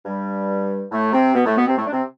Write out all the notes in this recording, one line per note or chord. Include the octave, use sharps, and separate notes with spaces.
G2 G3
A2 A3
C3 C4
B2 B3
A2 A3
B2 B3
C3 C4
A2 A3
D4
C3 C4